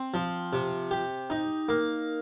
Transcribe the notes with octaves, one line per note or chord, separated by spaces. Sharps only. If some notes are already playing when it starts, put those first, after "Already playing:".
Already playing: C4
F3
C3
G4
D#4
A#3